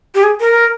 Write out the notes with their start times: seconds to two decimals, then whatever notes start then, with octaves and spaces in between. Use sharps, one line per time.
0.15 G4
0.23 G#4
0.40 A#4